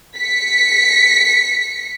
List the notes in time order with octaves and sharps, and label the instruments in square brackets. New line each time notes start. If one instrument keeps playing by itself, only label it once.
[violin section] B6 C#7